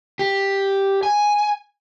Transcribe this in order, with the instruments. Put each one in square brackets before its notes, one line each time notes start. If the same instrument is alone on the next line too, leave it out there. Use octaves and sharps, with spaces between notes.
[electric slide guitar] G4
G#5